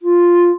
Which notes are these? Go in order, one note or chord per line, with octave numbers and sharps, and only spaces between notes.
F4